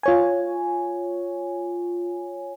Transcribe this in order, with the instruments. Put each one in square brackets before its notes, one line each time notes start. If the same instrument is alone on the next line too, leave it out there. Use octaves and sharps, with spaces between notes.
[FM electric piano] F4 C#5 G#5